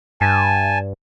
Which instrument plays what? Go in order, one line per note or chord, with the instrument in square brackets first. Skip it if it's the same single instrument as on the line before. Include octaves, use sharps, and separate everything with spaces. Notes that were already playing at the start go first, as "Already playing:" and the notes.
[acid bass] G2 [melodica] G#5 A5